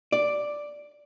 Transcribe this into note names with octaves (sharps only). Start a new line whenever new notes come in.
D5